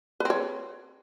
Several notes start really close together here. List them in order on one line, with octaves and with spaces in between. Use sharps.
B4 C4 C#5